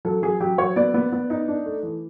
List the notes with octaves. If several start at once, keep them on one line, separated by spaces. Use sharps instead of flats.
F#3 A4
F#3 G#4
F#3 G4
F#3 C#5
B3 D5
B3
B3
D#4
D4
A3
E3